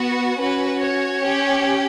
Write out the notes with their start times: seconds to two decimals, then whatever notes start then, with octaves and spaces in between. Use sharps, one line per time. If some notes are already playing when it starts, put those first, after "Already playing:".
Already playing: B3 F#4
0.38 C#4 F#4 B4
0.80 C#5
1.21 C#4 G4